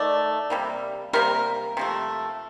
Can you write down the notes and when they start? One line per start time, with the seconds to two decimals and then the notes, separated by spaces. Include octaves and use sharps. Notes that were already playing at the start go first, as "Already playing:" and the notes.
Already playing: D#3 A3 D5
0.50 C3 G3 A#3
1.13 C3 G3 A#3 A#4
1.77 C3 F3 A3